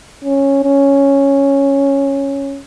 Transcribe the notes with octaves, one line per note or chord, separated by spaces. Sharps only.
C#4
C#4